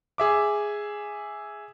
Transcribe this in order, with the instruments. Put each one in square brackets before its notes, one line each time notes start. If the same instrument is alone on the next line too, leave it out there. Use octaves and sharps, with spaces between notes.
[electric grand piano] G#4 E5 D6